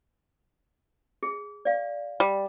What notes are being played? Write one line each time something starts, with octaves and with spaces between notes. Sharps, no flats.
G#4
D5 F5
G3